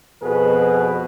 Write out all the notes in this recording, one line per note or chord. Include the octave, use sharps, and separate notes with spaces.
F2 B2 G#4 B4